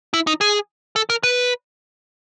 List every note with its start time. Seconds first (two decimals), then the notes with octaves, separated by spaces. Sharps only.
0.14 E4
0.27 D#4
0.41 G#4
0.96 A4
1.10 A#4
1.23 B4